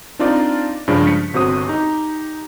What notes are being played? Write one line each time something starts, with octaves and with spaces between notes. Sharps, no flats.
C4 D4 D#4 F4 A#4 D5
G2 C#3 F3 G#3 D4
B6 C#7
G1 C3 F#4 C5 D#6
D#4 G4